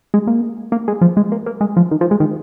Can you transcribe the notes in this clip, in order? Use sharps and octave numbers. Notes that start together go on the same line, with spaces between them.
G#3
A#3
A#3
G#3
F3
G#3
A#3
A#3
G#3
F3
D#3
F3
G#3
D#3